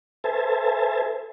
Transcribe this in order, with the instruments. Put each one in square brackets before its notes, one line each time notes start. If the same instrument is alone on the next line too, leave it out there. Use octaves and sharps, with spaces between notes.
[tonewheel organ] A4 B4 C5 E5 G#5 A5